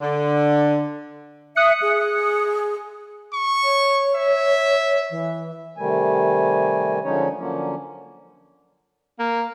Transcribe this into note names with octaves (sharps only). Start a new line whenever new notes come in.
D3
E5 D#6 F#6 C#7
G#4
C#6
C#5
E5
E3
C3 D#3 G3 A3 G#5
D3 F3 G#3 C#4 D#4 C#5
D3 F3 F#3 A#3 C#4
A#3